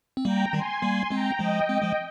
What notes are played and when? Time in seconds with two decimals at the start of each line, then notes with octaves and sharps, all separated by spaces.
0.17 C4
0.25 G3 A#3 G5 A#5
0.53 D#3 G3 G#5 C6
0.82 G3 A#3
1.10 G#3 C4 G5 A#5
1.39 F3 G#3 D#5 G5
1.68 G#3 C4 D#5 G5
1.82 F3 G#3